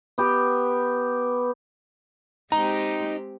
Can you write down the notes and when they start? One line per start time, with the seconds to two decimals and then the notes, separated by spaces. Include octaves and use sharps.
0.18 B3 G4
2.52 G#3 C4 D#4 G4 A#5